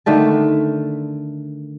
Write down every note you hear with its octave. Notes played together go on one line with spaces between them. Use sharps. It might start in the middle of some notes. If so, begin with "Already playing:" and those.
D3 D#3 A3 A4